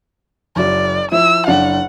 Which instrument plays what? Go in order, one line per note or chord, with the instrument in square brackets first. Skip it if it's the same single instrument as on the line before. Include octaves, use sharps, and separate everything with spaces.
[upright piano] F#1 F#4 [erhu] D5
[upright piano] F3 E4 [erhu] E6
[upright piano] F#1 D4 F5 [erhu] F#5